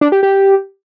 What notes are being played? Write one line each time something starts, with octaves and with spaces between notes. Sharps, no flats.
D4
G4
G4